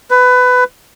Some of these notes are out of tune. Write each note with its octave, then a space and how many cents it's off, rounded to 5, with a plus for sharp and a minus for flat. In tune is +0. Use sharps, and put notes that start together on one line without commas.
B4 +20